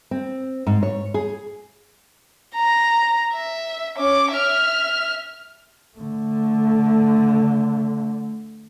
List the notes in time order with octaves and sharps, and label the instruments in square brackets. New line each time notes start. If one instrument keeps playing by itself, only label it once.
[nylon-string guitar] C4
G#2
C#5
G#4
[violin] A#5
E5
C#4 D6
E5 F6
[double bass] D3 A3